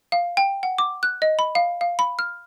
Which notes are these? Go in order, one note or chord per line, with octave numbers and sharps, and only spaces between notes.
F5
G5
F#5
D6
F#6
D#5
B5
F5
F5
B5
F6